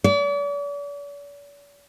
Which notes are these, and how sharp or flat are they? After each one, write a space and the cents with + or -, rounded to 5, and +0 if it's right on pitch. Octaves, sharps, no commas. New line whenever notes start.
D5 -45